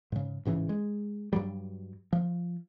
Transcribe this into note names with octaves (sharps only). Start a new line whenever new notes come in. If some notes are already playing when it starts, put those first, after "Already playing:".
G#2 C#3
A1 G#2 C#3 E3
G#3
G2 F#3 G3
F3